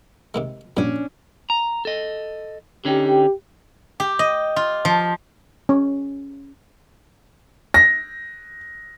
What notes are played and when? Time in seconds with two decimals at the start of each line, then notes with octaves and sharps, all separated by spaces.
0.34 C3 D#3 G#3
0.77 A#1 G3 C#4 D4
1.50 A#5
1.85 A4 D#5
2.85 D3 C#4 D#4 G4
4.00 G4
4.19 D#5
4.56 F4
4.85 F3
5.69 C#4
7.74 A#6